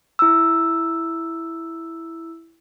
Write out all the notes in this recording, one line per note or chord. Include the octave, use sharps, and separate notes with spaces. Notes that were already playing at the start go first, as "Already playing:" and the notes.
E4 E6